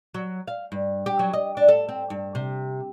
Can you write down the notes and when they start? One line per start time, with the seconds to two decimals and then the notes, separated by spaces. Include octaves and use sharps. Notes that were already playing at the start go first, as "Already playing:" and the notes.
0.14 F#3
0.48 F5
0.72 G2
1.06 G4
1.19 F#3
1.33 D#5
1.57 D4
1.68 A4
1.89 C4
2.10 G2
2.35 C3